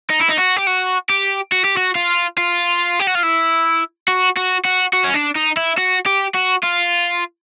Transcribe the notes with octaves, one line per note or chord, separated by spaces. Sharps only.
D#4
E4
D#4
F#4
G4
F#4
G4
F#4
G4
F#4
F4
F4
G4
F#4
F4
E4
F#4
F#4
F#4
F#4
C#4
D4
D#4
E4
F#4
G4
F#4
F4